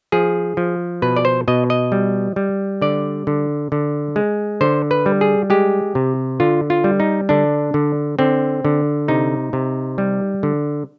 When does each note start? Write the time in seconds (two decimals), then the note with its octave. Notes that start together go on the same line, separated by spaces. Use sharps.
0.12 F3 G#4
0.57 F3
1.02 B2 B4
1.16 D5
1.25 C5
1.48 B2 D#5
1.70 D#5
1.92 G3
2.36 G3
2.82 D3 D5
3.27 D3
3.72 D3
4.16 G#3
4.61 D3 C5
4.91 B4
5.06 G3
5.21 G#4
5.50 G#3 G4
5.95 C3
6.40 D3 F4
6.70 F4
6.84 G3
7.00 D#4
7.29 D3 D4
7.74 D3
8.19 D3 C4
8.65 D3
9.08 C3 D#4
9.53 C3
9.98 G3
10.43 D3